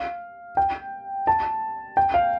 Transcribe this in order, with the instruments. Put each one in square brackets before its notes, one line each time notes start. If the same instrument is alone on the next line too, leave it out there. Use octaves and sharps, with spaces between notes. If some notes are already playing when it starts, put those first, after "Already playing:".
Already playing: [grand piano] F5
G5
A5
G5
F5